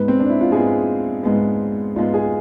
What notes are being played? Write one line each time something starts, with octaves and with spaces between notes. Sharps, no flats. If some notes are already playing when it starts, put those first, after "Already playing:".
Already playing: G#2 G#3 B3 B4
C4
D4
E4
F4
G#2 G#3 B3 G#4
G#2 G#3 B3
G#2 G#3 B3 F4
G#4